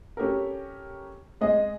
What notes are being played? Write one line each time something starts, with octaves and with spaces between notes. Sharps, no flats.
C#4 G4 A4 A#4
G#3 G#4 D#5